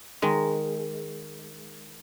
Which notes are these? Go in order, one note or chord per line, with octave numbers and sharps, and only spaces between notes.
D#3 G#3